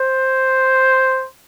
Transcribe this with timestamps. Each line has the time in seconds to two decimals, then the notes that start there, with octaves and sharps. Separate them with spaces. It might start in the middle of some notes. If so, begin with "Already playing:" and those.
Already playing: C5